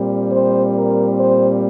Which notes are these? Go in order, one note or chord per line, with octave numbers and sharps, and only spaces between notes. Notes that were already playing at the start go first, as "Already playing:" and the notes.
Already playing: A#2 G3 C4
C5
A#4
C5